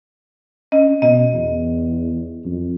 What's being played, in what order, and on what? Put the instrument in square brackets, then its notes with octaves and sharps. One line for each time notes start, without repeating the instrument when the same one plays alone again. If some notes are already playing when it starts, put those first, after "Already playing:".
[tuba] C#4 [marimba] D#5
[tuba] B2 [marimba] D#5
[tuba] E2
F2